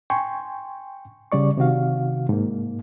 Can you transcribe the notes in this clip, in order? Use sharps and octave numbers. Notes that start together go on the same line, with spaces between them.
G5 G#5 C6 C#6
C#3 G3 D5 C#6
C3 D#3 F#4 F5
G#2 A#3